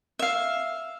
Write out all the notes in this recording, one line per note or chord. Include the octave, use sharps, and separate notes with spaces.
E5 F5